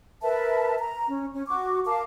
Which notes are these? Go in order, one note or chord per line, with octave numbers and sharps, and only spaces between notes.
A#4 B4 E5 A5
A#5
C#4
C#4
F#4 C#6 D6
A#4 F5 A5 D6